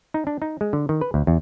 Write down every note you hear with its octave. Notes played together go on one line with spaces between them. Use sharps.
D#4
D4
D#4
G#3
D3
D#3
B4
D2
E2